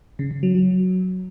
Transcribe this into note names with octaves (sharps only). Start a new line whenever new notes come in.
C#3
C#3
F#3
F#3